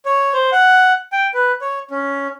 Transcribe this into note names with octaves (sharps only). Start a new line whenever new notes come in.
C#5
C5
F#5
G5
B4
C#5
C#4